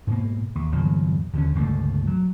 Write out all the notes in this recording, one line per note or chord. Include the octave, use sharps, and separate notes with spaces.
G#2 B2 A#3
D#2
G1 E2 A#2 F#3
D#2 D3 F#3 C#4
G1 C#2 A#2 A3
F#3